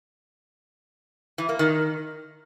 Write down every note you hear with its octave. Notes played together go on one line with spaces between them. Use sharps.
E3
A#3
D#3